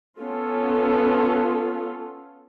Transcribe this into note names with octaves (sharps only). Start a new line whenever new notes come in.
B3 C#4 F4 A4